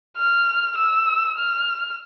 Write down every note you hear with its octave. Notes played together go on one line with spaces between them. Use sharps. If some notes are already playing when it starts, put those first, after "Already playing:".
F6
E6
F6